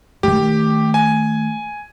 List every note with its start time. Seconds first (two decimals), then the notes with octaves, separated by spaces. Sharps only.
0.23 D#3 A3 G4
0.94 G#5